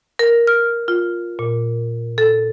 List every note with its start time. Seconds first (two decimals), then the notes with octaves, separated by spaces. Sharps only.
0.19 A#4
0.47 F6
0.88 F4
1.39 A#2
2.18 A4